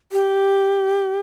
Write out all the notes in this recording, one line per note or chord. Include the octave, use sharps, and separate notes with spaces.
G4